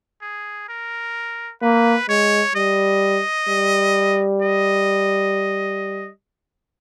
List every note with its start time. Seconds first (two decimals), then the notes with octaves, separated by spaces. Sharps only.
0.22 G#4
0.69 A#4
1.62 A#3 B4
2.09 G#3 C#5
2.55 G3 D#5
3.48 G3
4.42 D#5